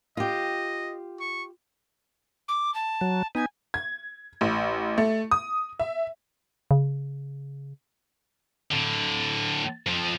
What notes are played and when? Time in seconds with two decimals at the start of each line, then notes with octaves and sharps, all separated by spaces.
0.17 F4 G4 D#5
1.20 C#6
2.48 D6
2.74 A5
3.01 F#3
3.35 B3 D#4 G#5
3.74 G#6
4.41 A1
4.98 A3
5.31 D#6
5.79 E5
6.71 C#3
8.71 A2 D3
9.87 F2 F3